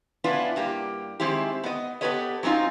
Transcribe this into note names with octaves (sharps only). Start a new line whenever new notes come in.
B3 C#4 D4 E4 F4 B4
G2 A#3 G4
D#3 G#3 C4 E4 G4
B3 D#5
B3 G4 A4 B4 C#5 D#5
F#3 C4 C#4 D#4 F4